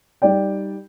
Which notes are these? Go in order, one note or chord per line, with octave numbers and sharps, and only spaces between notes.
G3 D#4 D5 G5